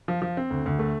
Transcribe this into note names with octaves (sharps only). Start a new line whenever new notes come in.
F3
F3
C4
D2
D2
A3